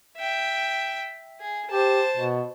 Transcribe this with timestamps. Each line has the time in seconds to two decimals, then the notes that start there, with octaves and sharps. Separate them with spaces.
0.17 E5 G5
1.41 G#4
1.71 G4 C5 A5
2.17 B2